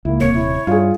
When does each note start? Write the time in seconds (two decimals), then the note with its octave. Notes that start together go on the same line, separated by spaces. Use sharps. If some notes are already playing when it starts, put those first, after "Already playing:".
0.05 C#2 A#3 E4
0.20 D#1 C3 A#3 C#5 C#7
0.34 E4
0.67 G2 F4 G#4